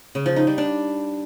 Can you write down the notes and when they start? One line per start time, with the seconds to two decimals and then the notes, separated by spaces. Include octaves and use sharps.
0.15 C#3
0.26 F3
0.36 D#4
0.47 G3
0.58 D4